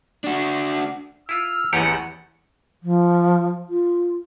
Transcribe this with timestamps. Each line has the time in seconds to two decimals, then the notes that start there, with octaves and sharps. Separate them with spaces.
0.24 D4 F#4
1.29 E4 F4 E6 F6
1.73 A1 E2 G4 C#5 D#5 F#5 C#7
2.83 F3
3.69 F4